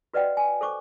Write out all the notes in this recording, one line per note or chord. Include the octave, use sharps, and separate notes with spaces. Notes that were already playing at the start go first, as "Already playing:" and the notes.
F#4 B4 D5 D#5 F#5 G5
G#5
A4 C5 C#6 D6